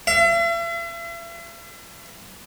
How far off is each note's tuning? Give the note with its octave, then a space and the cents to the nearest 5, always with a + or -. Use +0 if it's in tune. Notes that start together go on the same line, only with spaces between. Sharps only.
E5 +45